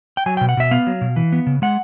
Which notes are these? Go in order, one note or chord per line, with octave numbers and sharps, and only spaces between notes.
G5
F#3 G#5
B2 G5
F#5
B2 E5
B3 F5
F#3
B2
E3
B3
C#3
G#3 F#5